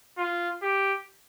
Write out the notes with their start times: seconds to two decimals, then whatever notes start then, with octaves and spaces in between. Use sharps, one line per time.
0.18 F4
0.62 G4